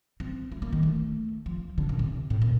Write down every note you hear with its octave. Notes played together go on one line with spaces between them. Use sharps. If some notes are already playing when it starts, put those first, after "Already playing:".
C4
A3
A#3
D#3
A3
F3
D3
A#2
C3
A2
A#2